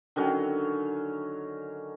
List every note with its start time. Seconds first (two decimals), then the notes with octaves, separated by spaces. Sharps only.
0.16 D3 D#3 F#3 C#4